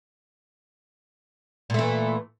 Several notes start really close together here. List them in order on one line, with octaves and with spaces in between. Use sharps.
A#2 A3 E3